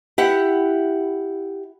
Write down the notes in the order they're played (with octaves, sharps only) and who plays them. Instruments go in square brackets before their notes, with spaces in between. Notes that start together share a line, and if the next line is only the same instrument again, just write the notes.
[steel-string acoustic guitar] E4 G4 F#5